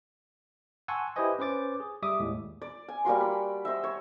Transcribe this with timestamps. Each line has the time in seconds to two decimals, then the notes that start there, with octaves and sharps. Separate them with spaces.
0.88 F#5 G#5 A5 C6 C#6 E6
1.16 E4 G4 B4 C5 D#5 G#5
1.39 C#4 B4 C5 D6 A6
1.80 G#4
2.02 G3 E5 D6 D#6
2.20 D#2 A2 G#3
2.62 D5
2.88 G#5
3.05 G3 A#3 F#4 C6
3.21 B5
3.65 C5 D#5 E5
3.84 C#5